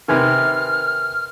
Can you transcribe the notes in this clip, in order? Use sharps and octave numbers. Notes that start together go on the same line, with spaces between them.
C3 D#3 A#4 B4 G#5 F6